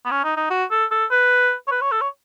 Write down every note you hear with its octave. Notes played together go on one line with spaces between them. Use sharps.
B3
C#4
D#4
D#4
F#4
A4
A4
B4
C#5
B4
C#5
A4
C#5